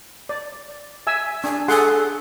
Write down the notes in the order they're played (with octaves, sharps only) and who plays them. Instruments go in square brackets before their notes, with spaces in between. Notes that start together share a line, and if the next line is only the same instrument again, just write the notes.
[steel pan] D5
E5 G#5 E6
[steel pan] D4 [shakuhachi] G#5
[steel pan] G#4 F#5 C6 [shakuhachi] A4